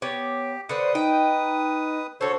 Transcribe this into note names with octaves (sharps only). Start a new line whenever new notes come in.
B3 G4 C#5 D6
D3 B4 C5 D#6 C#7
D#4 G5
D3 F#4 A4 C5 C#5